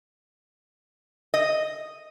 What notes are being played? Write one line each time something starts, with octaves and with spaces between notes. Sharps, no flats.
D#5